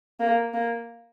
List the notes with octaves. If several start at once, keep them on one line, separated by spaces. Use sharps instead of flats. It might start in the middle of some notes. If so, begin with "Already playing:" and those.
A#3
A#3